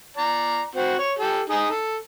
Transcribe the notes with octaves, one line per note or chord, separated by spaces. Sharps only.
D5 A#5
C4 F#4
C#5
G4 A4
D#4 G#4
A4